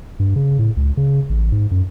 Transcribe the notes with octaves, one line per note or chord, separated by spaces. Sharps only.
G2
C#3
A2
C#2
C#3
A1
G#2
F#2